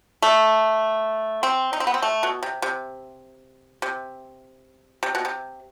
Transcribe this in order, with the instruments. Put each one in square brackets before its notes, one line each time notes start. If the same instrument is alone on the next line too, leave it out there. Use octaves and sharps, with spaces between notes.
[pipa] A3
C4
D#4
C4
B3
C4
A3
B2
C3
C3
C3
C3
B2
C3